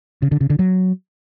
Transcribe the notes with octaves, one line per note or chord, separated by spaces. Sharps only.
C#3
D3
C#3
D3
F#3